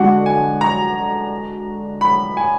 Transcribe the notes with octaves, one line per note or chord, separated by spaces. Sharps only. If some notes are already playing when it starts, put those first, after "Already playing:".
Already playing: D3 G#3 D4 F#4 F#5
G#5
A#5
B5
G#5